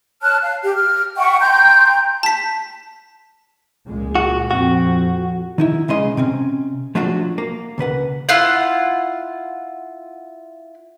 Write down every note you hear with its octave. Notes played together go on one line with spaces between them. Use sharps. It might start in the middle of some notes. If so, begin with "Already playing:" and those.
C#5 A5 F6 F#6
F5
G4
F6
E5 F#5 G5 C#6
G5 A#5 C6 G6
A5 B6
C#2 A#2 G#3
F#4
F2 C4 F#4
F2
D#3 D#4 E4
B1 C#3 G#3 D#5 C6
C3 C4 C#4
F3 F#3 A3 D4 F4 F#4
A#3
C#2 C#3 B4 F#5
E4 F4 F#5